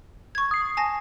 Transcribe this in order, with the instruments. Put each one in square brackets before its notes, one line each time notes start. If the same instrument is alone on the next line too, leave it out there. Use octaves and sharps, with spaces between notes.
[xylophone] C#6 G#6
[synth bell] D#6 C7
[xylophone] G#5 A5 A#6